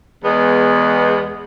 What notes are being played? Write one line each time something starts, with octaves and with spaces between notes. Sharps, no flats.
E2 G#3 B3